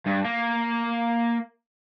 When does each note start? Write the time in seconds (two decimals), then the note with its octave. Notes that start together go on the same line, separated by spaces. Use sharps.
0.07 G2
0.25 A#3